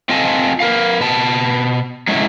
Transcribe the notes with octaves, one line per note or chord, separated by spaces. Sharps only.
C4 F4 A4 D#5 G#5 A5
A#4 B4 F5
B2 B4 A5
F#3 G#3 A3 C#4 E4